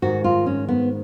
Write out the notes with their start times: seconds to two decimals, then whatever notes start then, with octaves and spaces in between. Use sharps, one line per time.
0.02 G#2 D#3 F#4
0.24 F4
0.46 C#4
0.68 B3